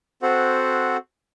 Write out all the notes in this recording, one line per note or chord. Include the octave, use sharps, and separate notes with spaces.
C4 F#4 A4 C5 F#5